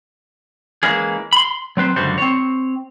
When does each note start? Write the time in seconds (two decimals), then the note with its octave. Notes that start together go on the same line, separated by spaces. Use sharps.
0.83 E3 G#3 A#3 C#4 G#4
1.33 B5 C6
1.77 F#3 C4 B4 C5
1.96 C#2 F#2 D3 G3 F#4 C5
2.18 C4 C#5